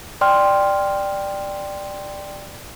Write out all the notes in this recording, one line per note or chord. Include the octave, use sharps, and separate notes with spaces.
D5 G5 C6 F6